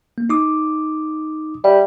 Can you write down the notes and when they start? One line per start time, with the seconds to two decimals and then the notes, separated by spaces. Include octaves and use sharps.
0.18 A#3
0.30 D#4 D6 D#6
1.64 G3 E5